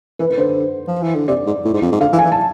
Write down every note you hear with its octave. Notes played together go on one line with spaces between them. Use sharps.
E3 B4
B4
D3 C5
F3
E3
D3
C3 D5
G#2
A2
G#2
F2
G#2
D3 F5
E3
G#5
E3
A5